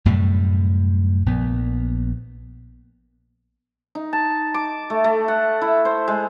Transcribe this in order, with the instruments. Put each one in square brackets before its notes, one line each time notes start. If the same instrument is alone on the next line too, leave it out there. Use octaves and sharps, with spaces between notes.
[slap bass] F#2 A2 C3 G3
A#1 B3
[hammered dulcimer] D#4
A5
D6
A3
A3
F#5
E4
C5
G#3